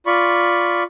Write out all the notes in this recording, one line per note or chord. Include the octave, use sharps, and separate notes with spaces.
F4 D5 B5 C#6